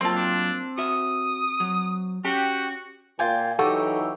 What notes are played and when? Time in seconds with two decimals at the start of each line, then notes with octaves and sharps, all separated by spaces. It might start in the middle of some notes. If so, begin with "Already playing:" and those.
0.01 F#3 A#3 C4 F4 A5
0.16 D4
0.78 F#4 E5 D#6
1.60 F#3
2.25 C#4 F#4 G4
3.19 A#2 F4 G5 G#5
3.59 E3 F#3 D#4 G4 A4 F#5 C#6 E6